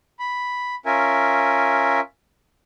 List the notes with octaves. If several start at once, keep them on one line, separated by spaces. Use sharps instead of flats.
B5
C#4 F4 A#4 E5 G#5